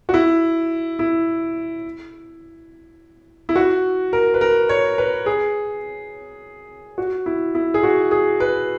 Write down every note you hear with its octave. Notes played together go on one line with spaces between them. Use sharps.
F#4
E4
E4
E4
F#4
A#4
B4
A#4
C#5
B4
G#4
F#4
E4
E4
G#4
F#4
G#4
B4